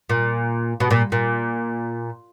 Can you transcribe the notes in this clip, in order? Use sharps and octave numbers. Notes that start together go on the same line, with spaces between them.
A#2
B2
A#2
A#2